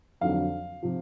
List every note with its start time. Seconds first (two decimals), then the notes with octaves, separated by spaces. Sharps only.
0.21 F2 D3 F#3 F5
0.83 C3 F3